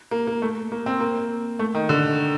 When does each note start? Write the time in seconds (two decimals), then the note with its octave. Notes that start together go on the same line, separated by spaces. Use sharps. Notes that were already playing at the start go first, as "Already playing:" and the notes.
0.11 A#3
0.27 A#3
0.42 A3
0.72 A#3
0.86 C4
1.00 A#3
1.59 A3
1.75 D#3
1.89 D3